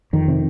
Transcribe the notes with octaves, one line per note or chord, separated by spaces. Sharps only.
F2 D#3
C3